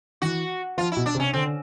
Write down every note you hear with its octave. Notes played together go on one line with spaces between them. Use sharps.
E3 F#4
F3 F4
B2 E4
D4
C3
C#4
D3 C4